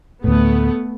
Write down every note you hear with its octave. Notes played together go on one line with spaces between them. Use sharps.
D2 A2 A3 B3